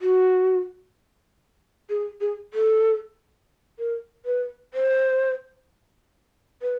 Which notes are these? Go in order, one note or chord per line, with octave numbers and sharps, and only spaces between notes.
F#4
G#4
G#4
A4
A#4
B4
C5
B4